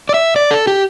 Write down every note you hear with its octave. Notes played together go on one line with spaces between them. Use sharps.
D5
E5
D5
A4
G4